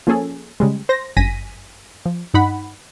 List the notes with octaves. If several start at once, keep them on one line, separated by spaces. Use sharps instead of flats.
F3 A#3 C#4 G#4 A4
C#3 G3 G#3
C5 A#6
G1 F#2 G#5 A#6 B6 D#7
F3
G2 D#4 F#5 B5